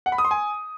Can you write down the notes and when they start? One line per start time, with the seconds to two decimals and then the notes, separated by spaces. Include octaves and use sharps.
0.06 F#5
0.12 B5
0.18 D#6
0.25 C6
0.31 G#5